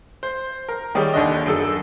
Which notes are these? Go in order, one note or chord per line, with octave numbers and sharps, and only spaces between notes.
C5
A#4
D#3 G3 G4 G#4 C#5
D#2 D3 D4 D#5
F#2 G#4 A4